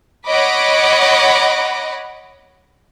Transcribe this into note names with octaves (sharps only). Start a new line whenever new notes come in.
C#5 D#5 F#5 B5 D6